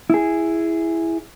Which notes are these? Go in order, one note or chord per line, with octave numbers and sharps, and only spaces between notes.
E4 G#4